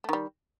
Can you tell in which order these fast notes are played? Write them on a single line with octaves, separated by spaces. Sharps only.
A3 D#3 G3